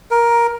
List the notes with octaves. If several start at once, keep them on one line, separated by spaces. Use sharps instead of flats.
A#4